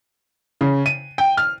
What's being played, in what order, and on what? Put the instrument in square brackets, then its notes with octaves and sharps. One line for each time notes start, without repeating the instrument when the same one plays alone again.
[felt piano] C#3
D#7
G5
F6